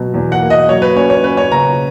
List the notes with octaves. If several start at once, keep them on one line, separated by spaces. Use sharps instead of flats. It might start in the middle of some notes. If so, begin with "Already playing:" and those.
Already playing: B2 F#3
E2
F#5
A#3
D#5
F#3 C#5
B4
C#4 C#5
C#5
C#4 B4
C#5
C#3 A#5